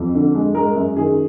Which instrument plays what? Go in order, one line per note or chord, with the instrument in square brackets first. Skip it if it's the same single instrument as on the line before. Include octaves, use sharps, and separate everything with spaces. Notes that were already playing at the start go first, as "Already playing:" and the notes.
Already playing: [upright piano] F2
D3
G#3
G#3 A#4
F#2
D#3 G#4